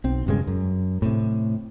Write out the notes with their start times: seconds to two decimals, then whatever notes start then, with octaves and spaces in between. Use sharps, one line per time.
0.04 B1 C4
0.27 E1 G2 C#3 G#3
0.47 F#2
1.02 A2 C3